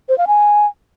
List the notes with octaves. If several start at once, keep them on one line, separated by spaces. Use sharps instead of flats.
C5
F5
G#5